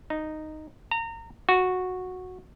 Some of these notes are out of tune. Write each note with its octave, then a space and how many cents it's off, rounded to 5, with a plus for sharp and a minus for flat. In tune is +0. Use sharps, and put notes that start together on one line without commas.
D#4 -5
A#5 -30
F#4 -10